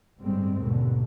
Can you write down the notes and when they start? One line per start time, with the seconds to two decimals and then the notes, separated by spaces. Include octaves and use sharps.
0.20 G1 A2 G3 G#3 C4
0.59 D#2 G#2 B2 D3